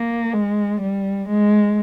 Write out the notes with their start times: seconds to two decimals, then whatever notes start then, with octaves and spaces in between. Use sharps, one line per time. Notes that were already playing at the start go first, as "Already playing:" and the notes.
Already playing: A#3
0.33 G#3
0.81 G3
1.29 G#3